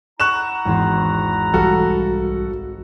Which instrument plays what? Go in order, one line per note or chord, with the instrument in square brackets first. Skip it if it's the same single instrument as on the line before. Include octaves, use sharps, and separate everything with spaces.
[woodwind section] E4 F#5 A#5 [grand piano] C#6 F#6 E7
[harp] G#1 E2 C5
[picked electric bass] B1 E3 G3 [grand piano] F#4 A4 [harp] F5